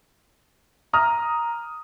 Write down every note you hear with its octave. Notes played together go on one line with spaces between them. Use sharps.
A#5 D#6 F6